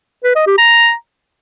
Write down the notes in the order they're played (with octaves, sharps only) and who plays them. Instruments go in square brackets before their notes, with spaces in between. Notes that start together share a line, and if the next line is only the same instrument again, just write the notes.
[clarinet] B4
D#5
G4
A#5